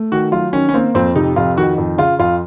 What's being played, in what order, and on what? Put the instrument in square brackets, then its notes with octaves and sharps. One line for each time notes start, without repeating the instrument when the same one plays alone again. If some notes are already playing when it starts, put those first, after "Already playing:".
Already playing: [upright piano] A3
[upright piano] D#3 [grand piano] F#4
[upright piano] F#3 [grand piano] F4
[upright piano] D#3 [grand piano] C#4
[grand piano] C#4
[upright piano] A#3 [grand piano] C4
[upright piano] F2 [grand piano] C4
[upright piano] C3 [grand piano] D#4
[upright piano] F2 [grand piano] F4
[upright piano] D#3 [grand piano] F#4
[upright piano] F2
[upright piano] C#3 [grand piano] F4
[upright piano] F2 [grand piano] F4